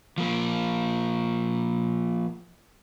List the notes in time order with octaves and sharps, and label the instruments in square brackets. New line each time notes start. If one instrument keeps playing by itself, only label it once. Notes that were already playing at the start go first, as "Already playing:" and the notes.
[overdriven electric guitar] F3 A#3